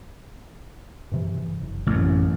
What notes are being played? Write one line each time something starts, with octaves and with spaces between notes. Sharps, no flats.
G2 C3 E3
F#1
A1 F#2 C3 A3